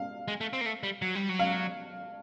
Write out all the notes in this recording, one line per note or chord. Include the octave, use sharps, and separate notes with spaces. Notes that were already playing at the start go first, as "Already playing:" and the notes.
Already playing: F5
G#3
A3
C4
A#3
A3
G3
F#3
G3
F#3
F5